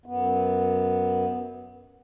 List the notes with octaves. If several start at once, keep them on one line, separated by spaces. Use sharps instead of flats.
F#2 B3